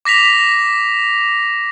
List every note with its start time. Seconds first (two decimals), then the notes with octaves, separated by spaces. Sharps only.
0.05 D6 A#6 B6 F7